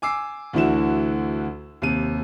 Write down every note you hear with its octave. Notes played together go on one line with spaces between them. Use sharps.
G#5 D6 E6 C7
D2 D3 E3 E4 F#4 E7
D#2 C3 D#7